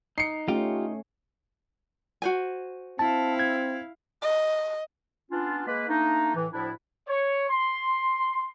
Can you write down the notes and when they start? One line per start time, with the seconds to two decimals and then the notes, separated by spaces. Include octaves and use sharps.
0.18 D#4 C7 C#7
0.48 A3 C#4 F4 G4
2.22 F#4 C5 G#5
2.99 C4 E4 F5 A5
3.39 G#6
4.22 D#5
5.31 B3 C#4 D4 F4
5.67 G#3 A#3 B4
5.88 A3 A#3 D4 D#4
6.35 A2 E3
6.53 D2 A2 F3 D4 E4
7.08 C#5
7.50 C6